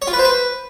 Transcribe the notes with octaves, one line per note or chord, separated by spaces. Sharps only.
C#5
F4
B4
C5
B4